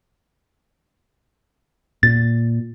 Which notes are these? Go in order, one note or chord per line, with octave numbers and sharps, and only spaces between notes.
A#2 A6